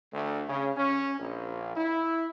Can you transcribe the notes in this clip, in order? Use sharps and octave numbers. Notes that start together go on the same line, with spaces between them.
D2
C#3
C#4
A#1
E4